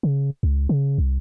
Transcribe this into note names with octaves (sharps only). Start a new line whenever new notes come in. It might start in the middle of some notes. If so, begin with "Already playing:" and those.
C#3
C#2
C#3
C2